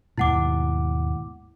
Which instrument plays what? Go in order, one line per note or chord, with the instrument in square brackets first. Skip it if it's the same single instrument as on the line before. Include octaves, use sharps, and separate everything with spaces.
[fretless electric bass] D#2 G#2 B2 [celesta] E4 F#5 D6